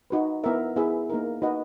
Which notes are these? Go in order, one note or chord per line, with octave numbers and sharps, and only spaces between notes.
D#4 F#4 B4
B3 E4 A#4 E5
B3 E4 G#4 B4 E5
A#3 D#4 A#4
D#4 F#4 B4 D#5 F#5